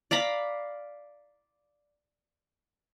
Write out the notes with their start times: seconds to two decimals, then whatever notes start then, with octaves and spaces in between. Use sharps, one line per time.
0.11 D5 F5 A#5 B5